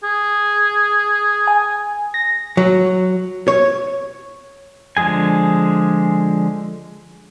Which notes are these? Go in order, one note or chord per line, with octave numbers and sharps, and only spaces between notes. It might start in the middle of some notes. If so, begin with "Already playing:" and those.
G#4
G#5
A#6
F#3
C#5
D3 F3 G#3 G#4 G#5